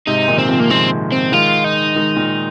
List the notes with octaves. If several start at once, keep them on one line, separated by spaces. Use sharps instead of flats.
G#2 C3 D#4
A#2 D#3
C4
C3 F3
A#3
D#3 G#3 C4
C4
D#3 G#3 F4
D#4
D#3 G#3
A#2 D#3